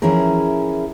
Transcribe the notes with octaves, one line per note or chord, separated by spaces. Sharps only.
E3 F3 C#4 E4 G#4 A#4